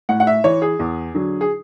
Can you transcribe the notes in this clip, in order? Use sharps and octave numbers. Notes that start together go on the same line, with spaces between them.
A2 F#5
F#5
E5
E3 C#5
G#4
E2
D3 F#3
G#4